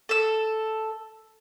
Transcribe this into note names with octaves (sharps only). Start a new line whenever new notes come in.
A4 E6